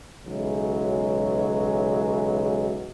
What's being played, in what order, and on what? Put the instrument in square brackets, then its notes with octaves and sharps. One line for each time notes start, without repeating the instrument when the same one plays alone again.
[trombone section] B1 C#3 E3 F#3 G#3